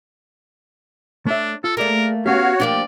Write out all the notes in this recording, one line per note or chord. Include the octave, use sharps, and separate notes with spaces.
A3 D4 C#5 E5
F4 A4
A3 A#3 G#4 A#4 D5
B3 C#4 F#4 G4 C#5 F5
F3 A#3 D4 G4 D5